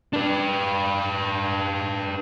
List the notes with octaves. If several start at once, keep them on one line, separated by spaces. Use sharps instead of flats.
D4 B4